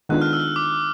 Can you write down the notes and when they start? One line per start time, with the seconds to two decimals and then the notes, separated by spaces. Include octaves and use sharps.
0.09 D#3 G#3 B3 D4 F4 F#6
0.22 F6
0.33 E6
0.56 D6